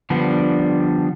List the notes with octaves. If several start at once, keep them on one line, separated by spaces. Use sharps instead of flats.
D3 F3 G3 B3 D4